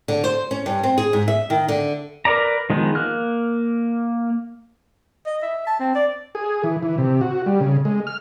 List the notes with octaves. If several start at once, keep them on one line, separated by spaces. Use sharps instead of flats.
D3
C5
C#4
G2
C4
G#4
G#2
E5
D#3
D3
A#4 B4 D5 A#5
D#3 F3 G#3 B3 D#4
A#3 F6 F#6
D#5
E5
A5
C4
D5
G#4
E3
E3
C3
F#4
G3
C#3
G#3
F6